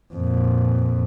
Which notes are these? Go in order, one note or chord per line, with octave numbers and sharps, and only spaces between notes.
F2 A#2